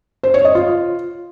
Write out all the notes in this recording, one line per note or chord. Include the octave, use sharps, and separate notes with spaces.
C5
C#5
D#5
F4